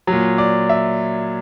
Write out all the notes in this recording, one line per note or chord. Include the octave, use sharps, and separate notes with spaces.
F#3
A#2
D5
E5